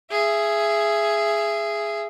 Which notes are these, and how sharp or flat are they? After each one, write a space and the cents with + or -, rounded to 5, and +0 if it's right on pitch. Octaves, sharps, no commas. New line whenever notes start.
G#4 +0 E5 +25